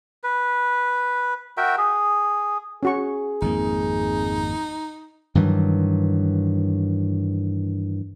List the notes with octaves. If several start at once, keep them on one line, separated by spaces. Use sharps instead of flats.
B4
F#4 A#4 E5 G5
G#4
C#4 F#4 G#4 C#6
G#1 F2 A#3 D#4
G2 D#3 E3 F#3